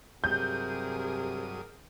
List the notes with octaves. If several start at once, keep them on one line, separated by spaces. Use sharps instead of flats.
G2 C3 F#3 G#4 A#4 D#6 G6